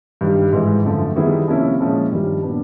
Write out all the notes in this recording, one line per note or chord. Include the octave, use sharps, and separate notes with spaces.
G2 D#3 G3
G#2 E3 G#3
F#2 D3 F3 A3
D#3 G3 B3 E4 G#4
C3 F3 A#3 C#4 E4
A#2 F3 G#3 C#4 E4
G2 D#3 G3
A#2 F#3 B3 D4